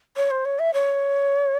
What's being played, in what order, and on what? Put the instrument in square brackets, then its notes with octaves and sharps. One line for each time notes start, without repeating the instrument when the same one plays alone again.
[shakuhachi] C#5
C5
C#5
E5
C#5